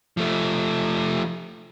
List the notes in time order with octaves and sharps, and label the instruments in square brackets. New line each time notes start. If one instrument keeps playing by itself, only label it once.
[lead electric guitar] F3 A3